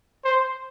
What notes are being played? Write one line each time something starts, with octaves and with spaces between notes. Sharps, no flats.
C5